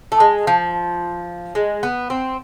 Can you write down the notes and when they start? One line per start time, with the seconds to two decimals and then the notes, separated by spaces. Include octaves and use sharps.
0.12 A3
0.20 G#3
0.47 F3
1.55 G#3
1.83 B3
2.10 C4